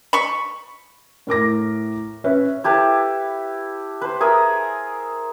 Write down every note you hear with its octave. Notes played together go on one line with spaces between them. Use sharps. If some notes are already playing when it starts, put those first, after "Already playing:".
B5 C#6
A2 A#4 D6 A#6
C#4 B4 E5
E4 G4 A4 B4
B4 C5
G#4 A#4 E5 D#6